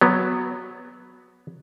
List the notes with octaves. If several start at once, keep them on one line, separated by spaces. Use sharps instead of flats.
F#3 B3